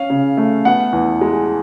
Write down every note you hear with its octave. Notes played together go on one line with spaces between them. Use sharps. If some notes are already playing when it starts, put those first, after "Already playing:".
Already playing: C#4 F5
C#3
A3
B3 F#5
E2
G#3